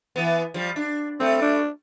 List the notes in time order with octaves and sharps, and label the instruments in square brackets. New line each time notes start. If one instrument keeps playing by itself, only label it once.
[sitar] E3 B3
F3 G3
D4
[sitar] G3 A3 [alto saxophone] C4
[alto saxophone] D4